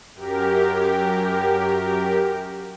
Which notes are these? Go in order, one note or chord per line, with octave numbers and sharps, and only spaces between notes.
F#2 G4 A#4